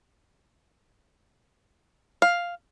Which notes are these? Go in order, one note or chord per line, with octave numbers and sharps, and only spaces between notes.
F5